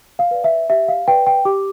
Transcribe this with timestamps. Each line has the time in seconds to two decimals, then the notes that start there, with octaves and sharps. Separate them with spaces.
0.19 F5
0.31 B4 D5
0.44 E5
0.69 G4 E5
0.88 F5
1.08 B4 D5 G5
1.27 G5
1.45 G4 D6